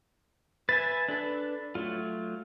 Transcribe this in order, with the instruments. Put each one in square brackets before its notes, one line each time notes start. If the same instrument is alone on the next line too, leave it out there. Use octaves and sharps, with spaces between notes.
[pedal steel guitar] B4 E5 G#5 [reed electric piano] A6
[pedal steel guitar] D4 A4 B4
F#3 A3 F4